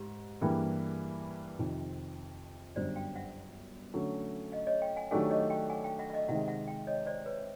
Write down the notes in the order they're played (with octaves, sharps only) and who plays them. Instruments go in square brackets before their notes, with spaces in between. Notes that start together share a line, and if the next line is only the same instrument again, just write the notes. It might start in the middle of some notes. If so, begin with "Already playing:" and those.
Already playing: [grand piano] G#2 [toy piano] G4
[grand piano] G2 E3 G3 A#3 [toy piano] G#4
[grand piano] F2 C3 D#3
[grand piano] G1 F#2 D3 G3 [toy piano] C5 D5
[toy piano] F5 G5
E5 F#5
[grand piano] D3 F#3 A3 C#4
[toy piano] D#5 F5
C#5 D#5
F5 G5
F#5 G#5
[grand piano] D#3 F#3 A3 D4 G4 [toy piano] F#5 G#5
[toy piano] C#5 D#5
F5 G5
F#5 G#5
F5 G5
E5 F#5
E5
D#5 F5
[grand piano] C3 D#3 G#3 [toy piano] E5 F#5
[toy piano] E5 F#5
F5 G5
C#5 D#5
C5 D5
B4 C#5